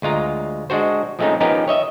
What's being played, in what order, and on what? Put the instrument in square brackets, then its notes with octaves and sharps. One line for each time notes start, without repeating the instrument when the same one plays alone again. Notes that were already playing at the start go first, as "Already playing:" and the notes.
[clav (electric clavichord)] D2 G#3 F4 A#5
G#3 D4 F#4 C5
F3 G#3 A3 C4 C#4 D#4
F3 B3 C#4 D#4 G4 A#4
C#5 D#5 E5